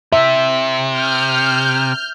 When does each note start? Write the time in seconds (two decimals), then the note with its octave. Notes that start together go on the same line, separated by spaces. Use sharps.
0.12 C3 E5
0.95 F6 G6